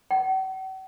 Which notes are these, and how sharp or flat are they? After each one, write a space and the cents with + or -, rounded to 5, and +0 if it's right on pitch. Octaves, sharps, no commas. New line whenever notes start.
F#5 +45